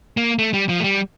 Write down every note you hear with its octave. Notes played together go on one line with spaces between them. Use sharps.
A#3
A3
G3
F3
A3
G3